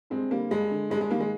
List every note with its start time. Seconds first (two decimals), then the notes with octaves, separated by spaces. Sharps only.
0.10 G2 G#3 C4
0.31 D3 G3 A#3
0.50 G2 G#3
0.71 D3
0.90 G2 G#3
1.01 G#3
1.10 D#3 G3 A#3
1.20 G#3